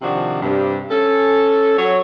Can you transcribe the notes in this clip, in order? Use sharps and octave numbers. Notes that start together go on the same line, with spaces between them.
C3 D#3 F3 D4 F#4
G2 C3
C#4 A4
F#3 C#5